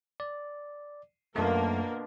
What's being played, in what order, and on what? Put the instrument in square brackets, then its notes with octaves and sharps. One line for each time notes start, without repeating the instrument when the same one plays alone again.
[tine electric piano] D5
[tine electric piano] F#2 A3 [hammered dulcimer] B2 D3 F3 [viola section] A#3 A#4